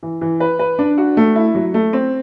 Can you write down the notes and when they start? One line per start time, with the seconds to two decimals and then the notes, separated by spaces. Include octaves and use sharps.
0.03 E3
0.21 E3
0.40 B4
0.59 B4
0.79 D4
0.98 F#4
1.17 A3
1.36 E4
1.55 F#3
1.74 A3
1.93 C4